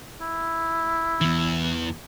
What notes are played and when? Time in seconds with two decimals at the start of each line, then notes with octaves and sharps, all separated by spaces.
0.21 E4
1.21 E2 E3